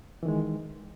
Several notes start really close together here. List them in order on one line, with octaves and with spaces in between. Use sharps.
E3 D#3 G#3